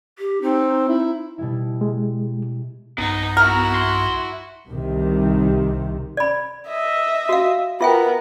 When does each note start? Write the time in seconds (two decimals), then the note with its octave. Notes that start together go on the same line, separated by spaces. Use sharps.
0.19 G4
0.42 C4 D#4
0.88 E4
1.38 B2 G3 E4
1.81 G#3
2.98 B1 G2 B3 D#4
3.37 E4 F#4 A#4
3.75 C6
4.68 C2 C3 D#3
6.17 D5 B5
6.68 D#5 E5
7.29 F#4 F5
7.81 B3 F4 A#4 E5 G5